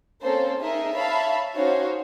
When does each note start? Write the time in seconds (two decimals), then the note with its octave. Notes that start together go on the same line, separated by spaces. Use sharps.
0.22 A#3 C4 C#4 A4 C5
0.59 D#4 G#4 A#4 D#5 E5
0.94 C#5 E5 F5 A5 B5
1.54 C#4 D#4 F#4 C5 C#5 F5